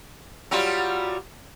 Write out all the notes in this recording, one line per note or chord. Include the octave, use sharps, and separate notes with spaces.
F#3 G3 F4